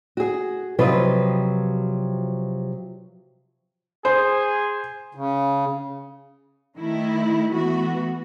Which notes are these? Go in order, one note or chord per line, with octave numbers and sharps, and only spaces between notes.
F#4 G#4
C3 F3 F#3 F4 B4 D#5
G#4 C5
C#3
D#3 A3 E4
E3 A3 B3 F#4